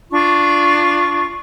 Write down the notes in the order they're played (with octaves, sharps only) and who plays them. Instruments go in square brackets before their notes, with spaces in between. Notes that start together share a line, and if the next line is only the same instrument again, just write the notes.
[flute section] D4 F4 C#6